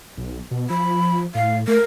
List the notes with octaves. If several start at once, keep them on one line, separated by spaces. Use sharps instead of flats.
B1
B2
F3 B5
A2 F5
A3 A#4